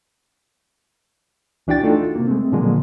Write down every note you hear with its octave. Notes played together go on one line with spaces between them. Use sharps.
C#2 E3 D4 F#4 G5 A6
A3 D4 D#4 F4 F#4 A4
C3 A#3
G#3 A3 C4
A#2 D3 F3 F#3 G#3 A#3